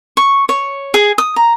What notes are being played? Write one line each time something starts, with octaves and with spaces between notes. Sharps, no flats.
C#6
C#5
G#4
D#6
A#5